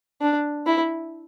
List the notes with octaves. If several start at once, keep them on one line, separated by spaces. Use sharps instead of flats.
D4
E4